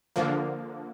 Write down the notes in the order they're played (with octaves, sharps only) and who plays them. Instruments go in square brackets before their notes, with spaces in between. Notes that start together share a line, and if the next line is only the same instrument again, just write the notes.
[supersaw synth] D3 F3 A#3